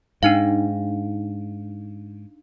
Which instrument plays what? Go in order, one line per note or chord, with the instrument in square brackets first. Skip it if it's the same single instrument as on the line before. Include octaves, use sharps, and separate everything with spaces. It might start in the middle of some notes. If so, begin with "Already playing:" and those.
[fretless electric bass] G#2 [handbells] D4 D#4 F5